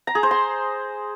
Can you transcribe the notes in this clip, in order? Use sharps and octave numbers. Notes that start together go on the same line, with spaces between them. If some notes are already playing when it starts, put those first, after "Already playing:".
A#5
G#4
C5
C6